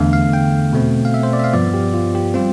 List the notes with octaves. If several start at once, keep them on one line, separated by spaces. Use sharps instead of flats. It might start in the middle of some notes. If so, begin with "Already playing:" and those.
Already playing: E2 D3 A3 F5
F5
G5
B2 A3 C4
F5
E5
C5
D5
E5
F5
G2 F3 B3 D5
G4
F4
G4
G3 C4 F4